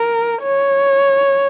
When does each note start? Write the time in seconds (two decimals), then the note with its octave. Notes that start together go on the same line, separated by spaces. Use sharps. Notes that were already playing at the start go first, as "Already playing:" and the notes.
Already playing: A#4
0.43 C#5